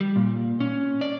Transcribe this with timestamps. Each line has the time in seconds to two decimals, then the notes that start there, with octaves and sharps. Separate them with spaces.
0.01 G3
0.16 A#2
0.60 C#4
1.01 D5